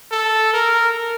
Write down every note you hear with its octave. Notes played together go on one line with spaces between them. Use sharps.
A4
A#4